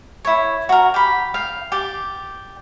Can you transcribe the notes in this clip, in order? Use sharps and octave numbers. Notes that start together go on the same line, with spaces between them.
E4 C#5
F#4 A#4
G4 B5
F5 G5
G4 D5